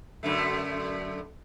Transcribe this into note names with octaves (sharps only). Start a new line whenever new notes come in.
F#2 D3 A3